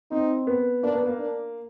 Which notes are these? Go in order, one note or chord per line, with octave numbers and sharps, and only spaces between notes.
C4 D#4
B3
A#3 D4
B3
A#3
D4